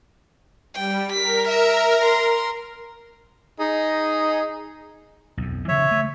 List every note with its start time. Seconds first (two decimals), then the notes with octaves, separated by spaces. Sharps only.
0.75 G3 G5
1.13 A#4 B6
1.49 E5
2.02 A#5 C6
3.58 D#4 G#4 D#5
5.37 B1 F2
5.68 C#3 E3 F3 C#5 E5
5.91 A3